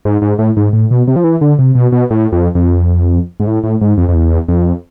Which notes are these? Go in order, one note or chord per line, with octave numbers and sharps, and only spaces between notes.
G#2
G#2
A2
G#2
A2
B2
C3
F3
E3
D3
C3
B2
B2
A2
F2
F2
G#2
A2
A2
G#2
F2
F2
E2
F2